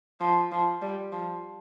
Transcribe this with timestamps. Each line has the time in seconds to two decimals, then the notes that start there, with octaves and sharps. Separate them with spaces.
0.20 F3
0.51 F3
0.82 G3
1.12 F3